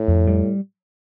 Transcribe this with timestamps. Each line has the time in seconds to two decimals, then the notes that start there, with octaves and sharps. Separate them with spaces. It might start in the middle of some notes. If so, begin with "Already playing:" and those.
Already playing: A2
0.08 F2
0.27 G3